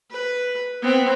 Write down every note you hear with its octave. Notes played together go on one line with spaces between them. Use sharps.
B4
B3 C4